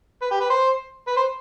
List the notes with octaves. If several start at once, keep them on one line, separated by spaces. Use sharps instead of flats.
B4
G4
B4
C5
B4
C5